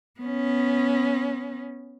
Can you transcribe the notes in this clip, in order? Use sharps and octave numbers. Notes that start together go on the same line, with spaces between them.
B3 C#4